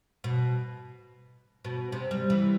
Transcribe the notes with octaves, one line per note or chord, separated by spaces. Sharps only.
B2
B2
C3
G3
E3